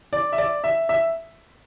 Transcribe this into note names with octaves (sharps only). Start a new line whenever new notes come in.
D5
E5
D5
E5
E5